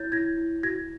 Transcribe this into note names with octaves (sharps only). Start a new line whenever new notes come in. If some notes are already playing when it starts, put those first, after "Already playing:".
Already playing: E4 C#5 G6 A6
E4 G#6 A#6
E4
F#4 G#6 A#6